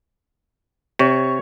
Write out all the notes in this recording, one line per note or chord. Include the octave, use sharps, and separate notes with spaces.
C3 C#5